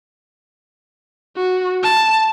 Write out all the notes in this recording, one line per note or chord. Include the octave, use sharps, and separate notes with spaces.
F#4
A5